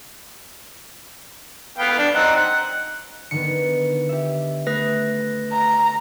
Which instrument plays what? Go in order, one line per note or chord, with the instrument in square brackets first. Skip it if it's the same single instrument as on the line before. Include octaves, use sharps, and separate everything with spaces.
[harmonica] B3 F5 G5
D4 G5
C4 D#4 F#5
F#5
[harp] D3 D#3 B3 [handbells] C#7
[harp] G4 E5
[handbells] A3 B4 A#6
[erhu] A#5